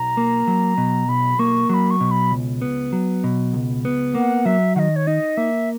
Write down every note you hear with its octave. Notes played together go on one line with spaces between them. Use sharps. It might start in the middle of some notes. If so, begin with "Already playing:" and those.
Already playing: B1 A#5
A#3
F#3
B2
B1 B5
A#3 C#6
F#3 B5 C#6
C#6
B2
B5
C#2
B3
F#3
B2
C#2
B3
A#3 F#5
F#3 E5
D#3 D#5 F#5
C#5
D#4 D#5
A#3 E5